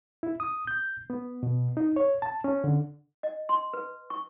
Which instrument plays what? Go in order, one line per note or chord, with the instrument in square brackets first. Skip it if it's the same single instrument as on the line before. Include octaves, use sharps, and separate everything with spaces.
[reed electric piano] E4
D#6
G6
B3
B2
D#4
C#5
A5
C#4
D3
[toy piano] D#5
C6
B4
C#6